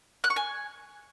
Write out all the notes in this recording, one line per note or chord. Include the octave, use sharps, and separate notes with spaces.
F#6
C#6
G#5